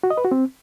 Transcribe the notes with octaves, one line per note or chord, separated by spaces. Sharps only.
F#4
D#5
B4
F#4
C4